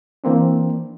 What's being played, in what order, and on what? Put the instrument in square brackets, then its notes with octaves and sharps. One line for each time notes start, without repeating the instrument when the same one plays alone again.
[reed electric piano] E3 A#3 C4 D4